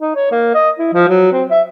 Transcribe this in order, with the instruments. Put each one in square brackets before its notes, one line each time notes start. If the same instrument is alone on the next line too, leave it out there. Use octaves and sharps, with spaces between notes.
[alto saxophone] D#4
C#5
A#3
D#5
E4
F3
F#3
C4
E5